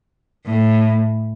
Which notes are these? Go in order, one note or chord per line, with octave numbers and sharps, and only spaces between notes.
A2